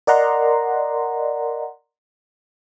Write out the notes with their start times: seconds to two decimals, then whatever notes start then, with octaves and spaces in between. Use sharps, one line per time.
0.07 A#4 D5 D#5 F#5 A#5 C6